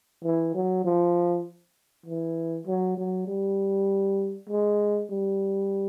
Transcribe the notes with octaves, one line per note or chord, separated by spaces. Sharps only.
E3
F#3
F3
E3
F#3
F#3
G3
G#3
G3